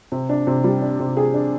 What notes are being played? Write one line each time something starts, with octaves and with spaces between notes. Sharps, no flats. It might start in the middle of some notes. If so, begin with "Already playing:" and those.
C3
D4
C3
G3
D4
C3
G#4
D4